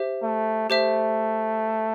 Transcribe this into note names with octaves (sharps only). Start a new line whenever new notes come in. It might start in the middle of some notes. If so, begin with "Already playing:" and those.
Already playing: G4 C5 E5
A3
A3 G4 C5 E5